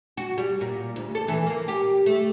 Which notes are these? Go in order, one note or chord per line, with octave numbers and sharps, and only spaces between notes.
F#4
G3
A#2
D2
A4
E3
A#3
G4
A3